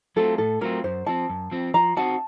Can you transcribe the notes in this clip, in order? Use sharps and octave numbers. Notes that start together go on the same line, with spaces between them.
F#3 A3 C4 F4 A4
A2 A4
F#3 A3 C4 F4 A#4
F#2 C5
F3 C4 A5
F#2
F3 C4
F3 A#5
C4 D#4 F#4 A5